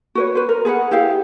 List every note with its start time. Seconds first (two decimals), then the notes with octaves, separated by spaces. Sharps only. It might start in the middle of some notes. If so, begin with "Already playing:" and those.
0.15 F#4 B4 C#5
0.35 B4 C5
0.49 A#4
0.65 G#4 A4 B4 F#5
0.91 E4 G4 G#4 F5